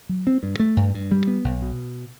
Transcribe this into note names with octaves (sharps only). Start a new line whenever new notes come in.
F#3
C4
G2
A3
G2
G2
G3
B3
B1
B2